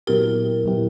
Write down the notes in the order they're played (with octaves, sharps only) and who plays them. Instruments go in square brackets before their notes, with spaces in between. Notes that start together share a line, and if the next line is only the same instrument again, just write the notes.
[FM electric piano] A#2 F#3 B3 E4 G4 [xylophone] A#4
[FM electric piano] A#2 F#3 B3 E4 G4